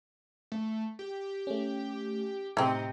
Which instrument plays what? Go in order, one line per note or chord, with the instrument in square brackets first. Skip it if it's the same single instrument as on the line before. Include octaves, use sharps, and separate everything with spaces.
[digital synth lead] A3
G4
[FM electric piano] A3 C#4
[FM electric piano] A2 D#5 [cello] C3 [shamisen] E3 C4 [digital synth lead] D#4